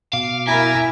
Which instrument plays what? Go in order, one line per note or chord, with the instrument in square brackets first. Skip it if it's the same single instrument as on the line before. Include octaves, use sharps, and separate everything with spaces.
[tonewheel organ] B2 D6 [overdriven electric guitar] F5
[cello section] E4 A#4 [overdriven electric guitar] E5 [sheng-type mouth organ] G#5 A#5